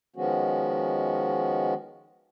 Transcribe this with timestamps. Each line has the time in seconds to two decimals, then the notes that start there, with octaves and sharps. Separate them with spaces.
0.16 D#3 F3 G#3 B3 C#4 F#4